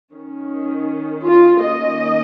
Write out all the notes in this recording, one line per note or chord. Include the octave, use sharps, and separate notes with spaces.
D#3 C#4
F4
D#3 A#3 C#4 D#5